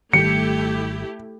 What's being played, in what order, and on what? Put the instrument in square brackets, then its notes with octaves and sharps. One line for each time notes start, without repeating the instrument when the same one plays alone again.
[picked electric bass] G#1 D#3 G3 [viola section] A3 E4 G4 [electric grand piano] C#7